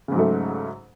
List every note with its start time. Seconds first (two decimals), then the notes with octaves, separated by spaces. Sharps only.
0.08 C#3
0.12 G#2
0.15 F#3
0.19 A3